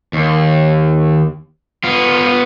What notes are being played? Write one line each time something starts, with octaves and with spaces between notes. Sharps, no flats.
D#2
B3 F4